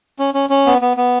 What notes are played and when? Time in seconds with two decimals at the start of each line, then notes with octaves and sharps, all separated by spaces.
0.19 C#4
0.34 C#4
0.50 C#4
0.66 B3
0.82 B3
0.97 B3